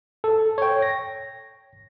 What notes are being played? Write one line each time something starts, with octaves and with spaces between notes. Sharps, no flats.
A4
C#5 G5
A#6